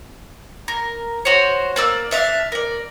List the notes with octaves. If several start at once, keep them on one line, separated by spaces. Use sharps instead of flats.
A#4
F#4 C5 C#5
A#3 D5 E6
D4 E5 F5
A#4 D5